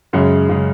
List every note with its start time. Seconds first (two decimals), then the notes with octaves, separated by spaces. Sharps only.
0.13 F#2 C#3 G#3
0.49 C#3 G#3